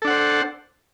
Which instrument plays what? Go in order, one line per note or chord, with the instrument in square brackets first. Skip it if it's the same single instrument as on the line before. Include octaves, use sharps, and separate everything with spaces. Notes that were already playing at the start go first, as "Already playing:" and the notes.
[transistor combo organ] A4
D4
F#5
C5